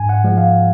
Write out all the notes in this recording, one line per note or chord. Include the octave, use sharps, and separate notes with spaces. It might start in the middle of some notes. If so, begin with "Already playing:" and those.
Already playing: G#2 G#5
F#5
F3 G#3
F5